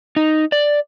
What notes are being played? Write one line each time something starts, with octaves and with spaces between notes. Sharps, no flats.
D#4
D5